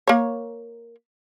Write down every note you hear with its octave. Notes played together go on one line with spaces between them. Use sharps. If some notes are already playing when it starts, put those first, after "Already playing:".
A#3 C#5